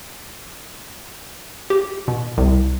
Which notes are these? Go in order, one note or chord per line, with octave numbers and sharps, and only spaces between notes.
G4
B2
C2